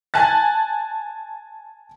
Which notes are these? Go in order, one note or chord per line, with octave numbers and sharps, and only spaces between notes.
G#5 A5 F#6 A6